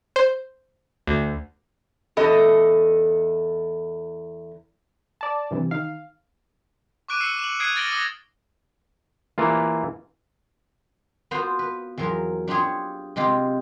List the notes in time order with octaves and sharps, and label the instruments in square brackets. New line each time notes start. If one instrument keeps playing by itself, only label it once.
[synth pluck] C5
D2
[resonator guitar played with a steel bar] E2 A4 D#5
[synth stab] D5 A5
G2 C3 E3
D#3 F5
[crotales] C#6 D6 F#6 D7 D#7
E6 C7 C#7
E7 F#7
D#6 F#6 G#6 C7 D7 D#7
F6 A6 A#6 D7 F#7 G7
D6 D#6 A#6 F#7
[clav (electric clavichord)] E3 A#3 F4
[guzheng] B3 F4 F#4 C5
B4
E2 F3 F#3 A#4
D4 F4 G4 G#4 C#5
C3 G#3 F4 G4